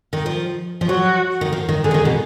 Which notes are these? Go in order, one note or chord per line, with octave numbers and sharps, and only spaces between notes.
D#3
F3
F3
F#3 F#4
D#3
F3
D#3
D3 G#4
F3
D#3
B2